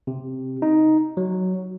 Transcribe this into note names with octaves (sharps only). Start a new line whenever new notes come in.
C3
D#4
F#3